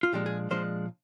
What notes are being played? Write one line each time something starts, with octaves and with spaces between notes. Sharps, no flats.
F4
A#2 F3 G#3 D4 G4
G#4
A#2 F3 G#3 D4 C5